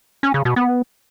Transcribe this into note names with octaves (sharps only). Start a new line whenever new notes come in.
C#4
C#3
B2
B3